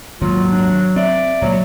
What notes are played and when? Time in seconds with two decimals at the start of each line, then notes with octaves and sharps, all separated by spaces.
0.21 G#1 D#2 A#2 F#3 F4
0.51 D4
0.96 C4 D5 E5
1.41 C#2 A#2 F#3